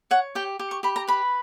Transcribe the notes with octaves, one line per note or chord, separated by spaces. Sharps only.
C#5 F#5
G4 G5
G4
C#6
G4 B5
A#5
B4 B5